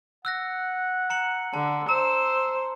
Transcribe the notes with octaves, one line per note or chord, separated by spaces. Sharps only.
F#5 E6 F#6 A#6
A#5 C#7 F#7
D3 A5
C5 A#5 E6